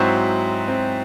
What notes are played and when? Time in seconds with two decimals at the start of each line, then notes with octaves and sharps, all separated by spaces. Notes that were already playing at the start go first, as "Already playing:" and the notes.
Already playing: G#2 F#3 C4 E4 F#4 C5
0.68 C4